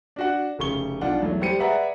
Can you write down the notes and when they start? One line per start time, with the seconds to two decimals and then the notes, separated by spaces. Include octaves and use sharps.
0.16 D4 F#4 F#5
0.59 F1 C#3 C#6 G7
1.01 B1 D4 F4 F#5
1.20 E2 F#3 A3
1.41 G3 G4 C5 C#7 D#7
1.59 G#4 B4 D5 E5 F#5 A#5